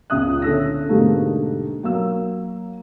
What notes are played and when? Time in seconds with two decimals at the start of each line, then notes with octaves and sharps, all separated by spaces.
0.10 C#2 A#2 C#3 E5 D#6 F#6
0.42 D3 C#4 A4 E6 A#6
0.89 G#2 B2 D3 G3 A3 A#3
1.83 F#3 A#3 E6